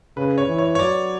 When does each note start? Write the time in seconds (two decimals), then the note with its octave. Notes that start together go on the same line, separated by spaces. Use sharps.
0.16 C#3 B4
0.38 C#5
0.47 E3
0.58 C#5
0.75 C#5
0.79 F#3 D5